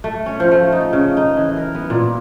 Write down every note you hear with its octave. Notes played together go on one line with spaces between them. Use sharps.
A3
C#4
F3
A3
D#4
C#3
D#4
E3
A#4
B3
A#2